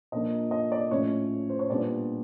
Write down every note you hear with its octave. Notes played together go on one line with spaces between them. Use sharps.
A#2 F3 A#3 D4 D#5
D#5
D5
A2 F3 A3 C#4 C#5
C5
C#5
A#2 G3 B3 D4 D5